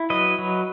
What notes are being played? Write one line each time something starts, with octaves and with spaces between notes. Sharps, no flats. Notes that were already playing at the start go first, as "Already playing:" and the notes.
Already playing: E4
F#3 B4 D#5
F#3